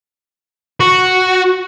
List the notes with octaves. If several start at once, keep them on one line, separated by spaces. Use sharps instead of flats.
F#4